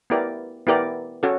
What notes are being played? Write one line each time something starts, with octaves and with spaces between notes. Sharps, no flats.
B3 E4 G4 A#4 D5
B3 E4 G4 A#4 D5
C#4 F#4 A4